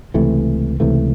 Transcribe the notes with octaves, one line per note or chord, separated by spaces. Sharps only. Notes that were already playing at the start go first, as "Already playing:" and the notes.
C#2 C3 E3 A3
C#2 C3 E3 A3